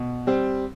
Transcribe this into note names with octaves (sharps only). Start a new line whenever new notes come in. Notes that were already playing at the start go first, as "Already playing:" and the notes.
Already playing: B2
G3 C4